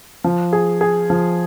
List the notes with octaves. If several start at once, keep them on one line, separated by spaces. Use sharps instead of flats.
F3
G#4
G#4
F3